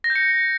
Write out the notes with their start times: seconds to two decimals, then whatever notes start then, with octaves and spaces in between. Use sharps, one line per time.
0.04 A#6
0.10 G6
0.16 C#7